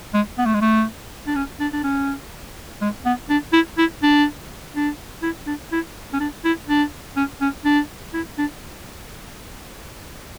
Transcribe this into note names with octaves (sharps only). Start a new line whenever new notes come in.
G#3
B3
A3
G#3
A3
D4
C#4
D4
D4
C#4
G#3
B3
D4
E4
E4
D4
D4
E4
D4
E4
C#4
D4
E4
D4
C#4
C#4
D4
E4
D4